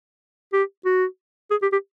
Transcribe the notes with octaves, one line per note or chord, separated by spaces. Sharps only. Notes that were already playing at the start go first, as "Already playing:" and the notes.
G4
F#4
G#4
G4
G4